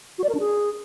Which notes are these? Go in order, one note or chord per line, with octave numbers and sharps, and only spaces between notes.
F#4
D5
A#4
D4
G#4